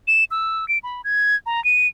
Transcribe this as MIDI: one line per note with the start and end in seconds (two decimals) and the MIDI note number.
0.08 0.24 100
0.31 0.67 88
0.68 0.78 98
0.83 1.02 83
1.04 1.36 92
1.46 1.63 82
1.64 1.87 99